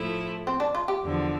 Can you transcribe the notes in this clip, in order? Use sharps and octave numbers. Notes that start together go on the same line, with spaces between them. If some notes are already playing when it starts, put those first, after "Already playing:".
Already playing: A2 F3 A3 E4
C4
D4
F4
G4
E2 D3 F3